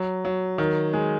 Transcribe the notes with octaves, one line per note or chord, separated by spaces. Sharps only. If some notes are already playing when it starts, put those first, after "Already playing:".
Already playing: F#3
F#3
D#3
G#3